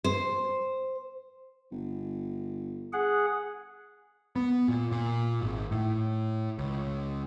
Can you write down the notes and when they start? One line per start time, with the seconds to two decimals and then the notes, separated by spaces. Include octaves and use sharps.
0.04 C5
1.72 G1
2.93 G#4 F#5
4.36 B3
4.68 A#2
4.91 A#2
5.42 G#1
5.71 A2
6.58 C#2